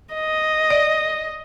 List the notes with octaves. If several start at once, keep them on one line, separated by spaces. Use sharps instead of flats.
D#5
D5